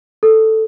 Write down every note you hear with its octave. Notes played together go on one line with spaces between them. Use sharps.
A4